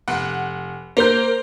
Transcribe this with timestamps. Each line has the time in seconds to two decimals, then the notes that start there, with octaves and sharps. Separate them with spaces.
0.08 F1 F#5
0.97 A#3 A#4 C5 G6